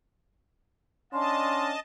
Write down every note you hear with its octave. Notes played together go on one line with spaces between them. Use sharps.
C#4 D4 D#5 F5 A5 C6